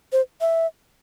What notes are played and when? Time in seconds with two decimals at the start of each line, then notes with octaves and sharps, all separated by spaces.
0.12 C5
0.41 E5